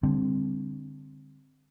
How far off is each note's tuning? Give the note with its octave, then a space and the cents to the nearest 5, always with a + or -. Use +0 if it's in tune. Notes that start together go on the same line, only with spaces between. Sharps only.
D3 +0 G3 +30 C4 +0